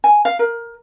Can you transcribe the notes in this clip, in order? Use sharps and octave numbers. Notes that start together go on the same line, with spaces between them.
G#5
F5
A#4